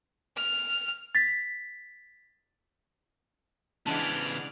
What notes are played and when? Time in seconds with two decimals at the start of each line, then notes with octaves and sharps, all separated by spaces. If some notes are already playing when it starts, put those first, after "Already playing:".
0.37 F6
1.15 A6 B6
3.86 C#3 E3 G#3 B3 D4 D5 A5 F6